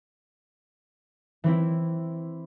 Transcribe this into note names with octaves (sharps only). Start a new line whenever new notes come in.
E3 C4 E4